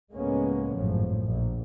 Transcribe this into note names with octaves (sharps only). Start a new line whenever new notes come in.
C#2 A2 G#3 A#3 B3 C#4
G#1 F#2 A2 F3
A#1